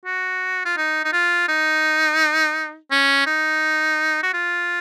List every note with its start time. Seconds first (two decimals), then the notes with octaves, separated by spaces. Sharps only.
0.05 F#4
0.66 F4
0.77 D#4
1.05 D#4
1.13 F4
1.48 D#4
2.91 C#4
3.27 D#4
4.23 F#4
4.34 F4